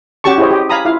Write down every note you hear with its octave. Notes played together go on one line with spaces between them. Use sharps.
C#4 F#4 G4 A5 C#6
E4 G4 G#4 C5 C#5 D#5
G4 D#5
F5 G#5 A#5 B5 D#6
E4 F4 F5